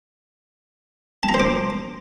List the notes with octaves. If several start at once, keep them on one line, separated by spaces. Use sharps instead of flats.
A5
A#5
C5
D6